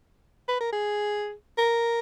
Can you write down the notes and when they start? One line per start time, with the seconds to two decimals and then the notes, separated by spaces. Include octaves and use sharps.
0.48 B4
0.60 A#4
0.73 G#4
1.57 A#4